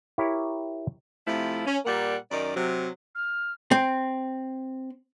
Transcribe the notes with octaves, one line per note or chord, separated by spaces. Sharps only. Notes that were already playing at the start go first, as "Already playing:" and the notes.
E4 G4 A#4 C#5
C3 F3 A3 E4
C#4
A#2 G3 A#4 F#5
F#2 D#3 D5
C3 F#3
F6
C4